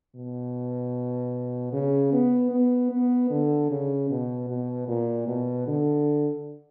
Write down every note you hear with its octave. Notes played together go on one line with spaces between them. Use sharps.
B2
C#3
B3
B3
B3
D3
C#3
B2
B2
A#2
B2
D3